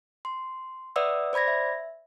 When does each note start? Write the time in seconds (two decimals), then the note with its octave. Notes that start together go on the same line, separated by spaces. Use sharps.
0.25 C6
0.96 B4 D5 E5 F#5 D#6 E6
1.33 C5 D5 B5 G#6 A#6
1.48 E5